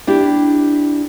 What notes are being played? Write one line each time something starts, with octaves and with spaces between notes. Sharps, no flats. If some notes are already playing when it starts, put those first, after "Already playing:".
D4 E4 G4